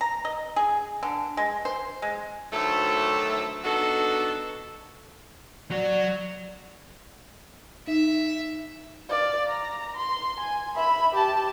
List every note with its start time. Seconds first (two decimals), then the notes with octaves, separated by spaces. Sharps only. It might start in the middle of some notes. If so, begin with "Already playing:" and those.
0.01 A#5
0.25 D#5
0.56 G#4
1.03 D3
1.37 G#3
1.65 C5
2.02 G#3
2.53 D2 D#3 F#3 A3 A4 E5
3.64 B3 D4 D#4 F#4 A4
5.71 F#3 F#4 D5
7.87 D#4 E5
9.09 D5 F5
9.48 A#5
9.96 C6
10.40 G#5
10.75 E5 B5
11.14 G4 A5